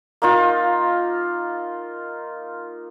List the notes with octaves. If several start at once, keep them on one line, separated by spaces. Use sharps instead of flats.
A#3 D#4 F4